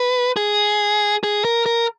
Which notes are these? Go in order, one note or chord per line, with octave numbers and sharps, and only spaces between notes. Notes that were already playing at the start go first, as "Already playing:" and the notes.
Already playing: B4
G#4
G#4
A#4
A#4